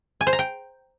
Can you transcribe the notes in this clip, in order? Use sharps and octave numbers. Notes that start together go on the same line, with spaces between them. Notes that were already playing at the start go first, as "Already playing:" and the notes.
G#5
C5
A#5
G5